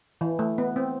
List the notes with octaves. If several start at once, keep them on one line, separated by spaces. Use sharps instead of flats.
E3
A3
B3
C4